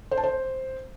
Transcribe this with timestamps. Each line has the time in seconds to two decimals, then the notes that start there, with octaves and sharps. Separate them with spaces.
0.11 C5
0.17 A5
0.24 C5